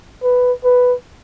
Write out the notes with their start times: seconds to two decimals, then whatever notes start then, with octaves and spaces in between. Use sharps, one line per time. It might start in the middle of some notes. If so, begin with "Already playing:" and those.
0.23 B4
0.64 B4